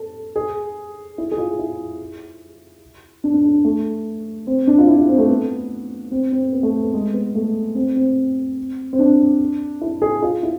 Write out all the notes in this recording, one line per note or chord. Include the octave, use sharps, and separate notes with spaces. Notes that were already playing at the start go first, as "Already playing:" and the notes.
Already playing: A4
G#4
E4
G#4
F4
E4
D4
D4
D4
A3
C4
D4
F4
E4
E4
C4
A3
B3
C4
C4
B3
A3
B3
G#3
B3
A3
C4
C4
C4
D4
E4
G#4
F4
E4